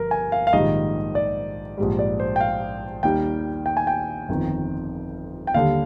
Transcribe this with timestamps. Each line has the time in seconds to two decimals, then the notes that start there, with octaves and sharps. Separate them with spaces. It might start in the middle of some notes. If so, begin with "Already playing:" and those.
Already playing: G1 G2 F3 A#4
0.11 G#5
0.32 F5
0.47 F5
0.53 A#1 G#2 D#3 G3 D#5
1.15 D5
1.78 A#1 G#2 G3
1.99 D5
2.20 C5
2.36 G5
2.41 F5
3.03 D#2 D#3 G3 G5
3.66 G5
3.77 G#5
3.87 G5
4.29 G1 F2 D#3
5.47 G5
5.54 D#2 D3 G3 F5